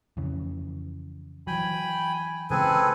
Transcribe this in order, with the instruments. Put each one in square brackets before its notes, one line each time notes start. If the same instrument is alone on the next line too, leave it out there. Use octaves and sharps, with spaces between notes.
[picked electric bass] F2 C#3 E3
[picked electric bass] E3 F#3 [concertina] G5 G#5 B5
[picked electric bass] C#3 E3 G#3 [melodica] C4 A4 B4 [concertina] G#4 G#5